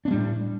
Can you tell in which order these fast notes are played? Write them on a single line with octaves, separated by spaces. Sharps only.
D4 B3 G3 A2